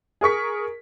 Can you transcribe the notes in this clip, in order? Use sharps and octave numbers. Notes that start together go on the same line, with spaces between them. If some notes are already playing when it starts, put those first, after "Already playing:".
G#4 A#4 C#6 B6